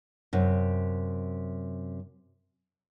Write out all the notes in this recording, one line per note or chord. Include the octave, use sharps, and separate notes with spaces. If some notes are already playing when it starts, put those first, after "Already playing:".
F#2 C3